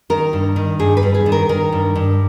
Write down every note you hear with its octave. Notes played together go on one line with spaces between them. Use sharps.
D#3 A#4
G2
D#3
G2 G#4
B4
G2
G#4
D#3
A#4
D#3 A#4
G2
G2